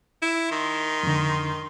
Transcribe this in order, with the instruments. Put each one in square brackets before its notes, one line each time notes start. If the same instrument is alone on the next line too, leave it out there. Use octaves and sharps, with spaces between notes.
[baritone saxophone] E4
[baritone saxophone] D#3 [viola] C6
[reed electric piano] F2 D3